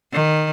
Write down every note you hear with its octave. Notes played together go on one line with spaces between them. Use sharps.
D#3